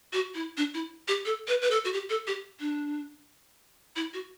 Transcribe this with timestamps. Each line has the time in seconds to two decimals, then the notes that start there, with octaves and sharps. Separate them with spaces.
0.13 F#4
0.34 E4
0.57 D4
0.74 E4
1.08 G4
1.26 A4
1.48 B4
1.62 B4
1.71 A4
1.85 F#4
1.93 G4
2.10 A4
2.27 G4
2.60 D4
3.96 E4
4.14 F#4